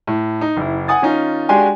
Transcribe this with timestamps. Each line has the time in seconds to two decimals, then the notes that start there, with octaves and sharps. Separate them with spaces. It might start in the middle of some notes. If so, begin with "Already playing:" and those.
0.07 A2
0.41 D#4
0.57 F#1 E4
0.88 F#5 G#5 D#6 A6
1.02 D#3 C#4 D#4 F4
1.49 G#3 D4 F#4 G4 G#5 C6